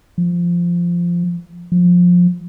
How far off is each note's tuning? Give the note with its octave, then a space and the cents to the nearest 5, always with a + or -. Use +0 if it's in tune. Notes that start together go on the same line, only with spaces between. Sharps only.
F3 -10
F3 +20